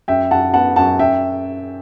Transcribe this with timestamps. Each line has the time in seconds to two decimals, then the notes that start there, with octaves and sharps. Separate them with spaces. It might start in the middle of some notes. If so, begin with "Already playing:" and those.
0.08 F#2 E5 G5
0.31 F#2 F#5 A5
0.53 B3 F#5 A5
0.76 F#2 F#5 A5
0.99 F#2 E5 G5